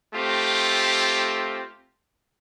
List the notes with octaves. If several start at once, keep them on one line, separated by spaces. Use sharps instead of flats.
A3 C4 F4 G4